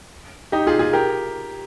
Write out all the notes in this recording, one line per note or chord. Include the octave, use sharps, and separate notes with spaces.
D#4 G4
F4 G#4
F4 G#4
G4 A#4